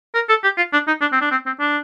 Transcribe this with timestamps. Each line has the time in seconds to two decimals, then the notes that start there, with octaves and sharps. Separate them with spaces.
0.15 A#4
0.29 A4
0.44 G4
0.57 F4
0.73 D4
0.88 D#4
1.01 D4
1.12 C4
1.21 D4
1.31 C4
1.46 C4
1.60 D4